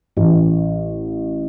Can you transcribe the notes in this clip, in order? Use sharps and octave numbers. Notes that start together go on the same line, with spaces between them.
A1